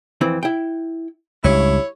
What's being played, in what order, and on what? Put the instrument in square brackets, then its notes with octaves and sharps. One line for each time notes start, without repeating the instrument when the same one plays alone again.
[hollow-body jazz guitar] F2 E3 C4
E4 G5
[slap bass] C#2 [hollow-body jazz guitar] G2 [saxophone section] E4 C#5